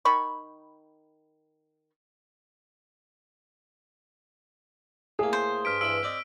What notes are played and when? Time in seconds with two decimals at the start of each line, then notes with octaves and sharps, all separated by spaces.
0.05 D#3 B5 C#6
5.19 A2 A#3 G#4
5.33 C5
5.65 G2 F6 B6 D7
5.81 G2 E3 B5 E6 D7
6.03 C4 D5 D#5